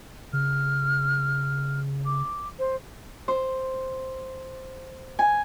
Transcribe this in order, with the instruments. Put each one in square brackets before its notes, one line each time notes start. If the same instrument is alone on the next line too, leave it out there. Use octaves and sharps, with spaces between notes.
[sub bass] C#3 [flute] F6
[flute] D6
C5
[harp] C5
G#5